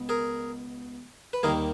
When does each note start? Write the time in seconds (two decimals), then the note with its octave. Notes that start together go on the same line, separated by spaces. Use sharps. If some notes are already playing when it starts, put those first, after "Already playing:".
Already playing: C#2 B2
0.09 G#4 A#4
1.33 B4
1.43 D#2 D#3 G3 A#3 G#4 A#4